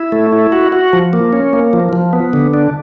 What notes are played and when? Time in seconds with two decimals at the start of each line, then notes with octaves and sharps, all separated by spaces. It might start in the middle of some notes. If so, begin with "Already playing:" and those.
Already playing: E4
0.12 A3
0.32 E4
0.52 F#4
0.72 F#4
0.93 F3
1.13 A#3
1.33 C#4
1.53 A#3
1.73 F3
1.93 F3
2.13 B3
2.33 D3
2.54 D4